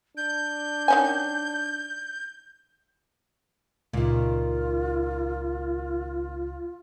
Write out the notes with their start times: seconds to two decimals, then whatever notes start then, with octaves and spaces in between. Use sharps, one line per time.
0.17 D4 G6
0.88 D#3 C#4 G#5
3.93 C#2 A#2 D#3 F4